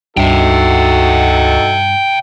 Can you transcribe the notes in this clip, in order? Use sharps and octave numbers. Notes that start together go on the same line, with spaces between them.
C#2 G2 D#4 F#4 A4 E5 G5